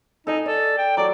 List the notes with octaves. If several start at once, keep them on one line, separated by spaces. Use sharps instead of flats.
D#4 A4 D#5 G#5
A4 D5
G5
F#3 A4 D5